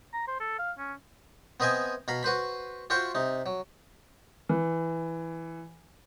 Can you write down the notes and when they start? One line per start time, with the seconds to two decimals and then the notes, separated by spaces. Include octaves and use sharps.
0.13 A#5
0.28 C5
0.40 A4
0.59 F5
0.78 C#4
1.60 B3 C4 D#5 E5 G5 G#5
2.08 B2 F5 A#5 B5
2.23 F#4 B4 C5 B5
2.90 F4 F#4 C5 E5 F#5 G5
3.15 C3 D#4
3.46 F#3
4.49 E3